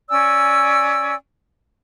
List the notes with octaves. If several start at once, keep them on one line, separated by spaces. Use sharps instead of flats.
C#4 D5 G#5 E6